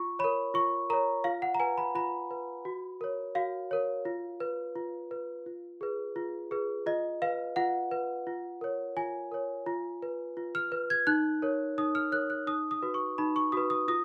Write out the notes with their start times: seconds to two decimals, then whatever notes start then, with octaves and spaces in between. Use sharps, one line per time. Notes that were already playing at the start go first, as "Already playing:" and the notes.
Already playing: F4 C#6
0.19 A#4 C#5 B5
0.54 F4 C#6
0.90 A#4 C#5 A#5
1.24 F4 F5
1.42 F#5
1.55 A#5
1.60 B4 G#5
1.78 B5
1.95 F4 B5
2.31 B4
2.65 F#4
3.01 A#4 C#5
3.35 F#4 F5
3.71 A#4 C#5
4.05 F4
4.40 B4
4.76 F4
5.11 B4
5.46 F4
5.81 G#4 B4
6.16 F4
6.51 G#4 B4
6.86 F4 D#5
7.22 B4 F5
7.56 F4 F#5
7.91 B4
8.27 F4
8.61 A#4 C#5
8.97 F4 G#5
9.32 A#4 C#5
9.66 F4
10.02 B4
10.37 F4
10.55 F6
10.72 B4
10.90 G#6
11.07 D#4 F#6
11.42 A#4 C#5
11.78 D#4 D#6
11.95 F6
12.12 A#4 C#5 F#6
12.30 F#6
12.47 D#4 D#6
12.71 D#6
12.82 F#4 B4
12.94 C#6
13.18 D#4 B5
13.36 C#6
13.52 F#4 B4 D#6
13.70 D#6
13.88 F4 D#6